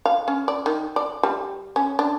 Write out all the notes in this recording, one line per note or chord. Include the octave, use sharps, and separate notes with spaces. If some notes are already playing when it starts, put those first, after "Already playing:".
F5
C#4
D5
D#3
D5
G3
C#4
D4